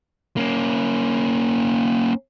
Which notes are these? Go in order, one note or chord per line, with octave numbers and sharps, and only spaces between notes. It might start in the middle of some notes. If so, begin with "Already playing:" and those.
A#3 C#4